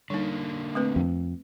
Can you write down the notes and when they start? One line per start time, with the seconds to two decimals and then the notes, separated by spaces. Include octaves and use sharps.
0.10 D3 G3 A#3 D#4
0.75 A3 C4 B4
0.96 F2